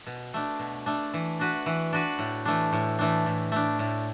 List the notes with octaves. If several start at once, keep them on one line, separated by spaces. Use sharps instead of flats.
B2
A3 D4
B2
A3 D4
E3
D4 F#4 B4
E3
D4 F#4 B4
A2
E3 A3 D4
A2
E3 A3 D4
A2
A3 D4
A2